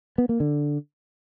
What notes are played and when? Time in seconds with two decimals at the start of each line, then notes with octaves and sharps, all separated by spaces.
0.18 B3
0.29 A#3
0.40 D3